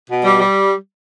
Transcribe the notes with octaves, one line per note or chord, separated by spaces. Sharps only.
B2
G3
G3